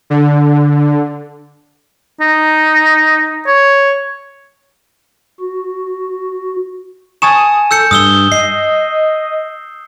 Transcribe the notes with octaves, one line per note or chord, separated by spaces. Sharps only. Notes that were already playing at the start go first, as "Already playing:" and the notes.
D3
D#4
C#5
F#4
G#5 A5 C#6 D#6 E7
A4 E6 G6 C#7
G2 D#6 E6 G7
D#5 C7